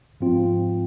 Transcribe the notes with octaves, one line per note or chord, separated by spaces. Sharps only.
G#2 F3 C4 F4